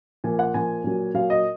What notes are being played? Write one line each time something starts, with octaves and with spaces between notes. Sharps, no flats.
A#2 F3 G#5
F#5
A#2 F3 G#5
A#2 F#3
A#2 F#3 F5
D#5